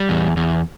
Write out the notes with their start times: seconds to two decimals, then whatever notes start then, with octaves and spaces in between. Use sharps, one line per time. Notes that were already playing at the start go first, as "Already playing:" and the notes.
Already playing: G3
0.09 E2
0.37 E2